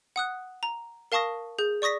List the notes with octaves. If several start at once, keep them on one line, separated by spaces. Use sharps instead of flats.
F#5 D#6 F#6
A#5
A#4 F5 A5 C#6 D#6 A#6
G#4 G6
D5 C#6 D#6 A#6 B6